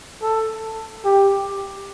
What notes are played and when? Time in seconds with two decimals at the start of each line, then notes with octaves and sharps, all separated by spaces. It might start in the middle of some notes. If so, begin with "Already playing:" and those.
0.22 A4
1.05 G4